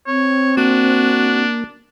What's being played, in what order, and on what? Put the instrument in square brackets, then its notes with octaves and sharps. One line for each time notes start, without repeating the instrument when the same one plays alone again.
[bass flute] C4 [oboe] C#5
[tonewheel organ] A#3 [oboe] D4 [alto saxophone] F#4